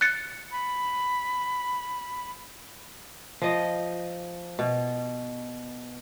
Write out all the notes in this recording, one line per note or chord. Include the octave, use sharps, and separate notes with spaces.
F#6 A6 C#7
B5
F3 D#5
B2